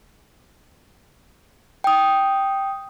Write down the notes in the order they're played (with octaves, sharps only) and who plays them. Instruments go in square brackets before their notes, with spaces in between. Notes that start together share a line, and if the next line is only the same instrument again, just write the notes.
[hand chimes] G5 D#6